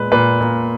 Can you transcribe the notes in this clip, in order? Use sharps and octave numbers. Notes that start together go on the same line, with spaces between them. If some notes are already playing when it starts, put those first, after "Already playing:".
Already playing: A#2 G#3 B4
A#2 B4
A#2